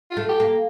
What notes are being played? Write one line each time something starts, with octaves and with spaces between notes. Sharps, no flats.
F4
A3
G4
A#3